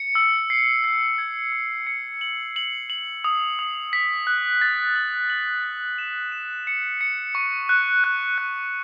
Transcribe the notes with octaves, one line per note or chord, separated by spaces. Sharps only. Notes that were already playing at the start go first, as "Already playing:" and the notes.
Already playing: C#7
E6
C7
C7
G#6
E6
C#7
F#7
F#7
F#7
D#6
D#6
B6
F#6
A6
F#7
F#7
A6
E7
E7
C#7
C#7
C#6
F#6
F#6
F#6